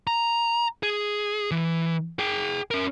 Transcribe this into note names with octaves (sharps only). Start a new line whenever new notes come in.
A#5
G#4
E3
G#4 G5
C#4 A#4